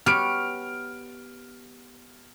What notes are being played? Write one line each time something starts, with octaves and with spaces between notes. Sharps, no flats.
B3 G4 C#5 F6 D7